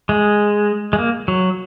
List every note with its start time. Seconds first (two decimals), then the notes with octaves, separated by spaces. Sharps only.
0.09 G#3
0.93 G#3
0.99 A#3
1.28 F#3